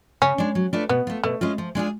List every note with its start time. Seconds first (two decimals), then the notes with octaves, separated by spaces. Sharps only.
0.22 C#3 C#4
0.38 G#3 D4
0.55 F#3
0.73 A3 D4 F4 B4
0.89 B2 B3
1.07 A3 F4
1.24 B2 A3
1.41 G#3 C#4 F4
1.58 F3
1.75 G#3 D4 F4 G#4